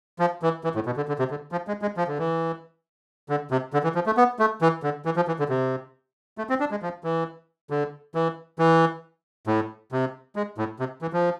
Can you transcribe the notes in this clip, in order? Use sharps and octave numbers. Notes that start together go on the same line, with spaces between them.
F3
E3
E3
A2
B2
D3
D3
C3
D3
F3
G#3
G#3
F3
D3
E3
D3
C3
D3
E3
F3
A3
B3
A3
E3
D3
E3
F3
E3
D3
C3
A3
C4
D4
G#3
F3
E3
D3
E3
E3
A2
C3
G#3
A2
C3
E3
F3